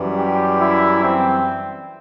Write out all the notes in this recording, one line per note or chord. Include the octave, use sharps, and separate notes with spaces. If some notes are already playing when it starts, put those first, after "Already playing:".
Already playing: F#2 E3 G3
G4
E4
C4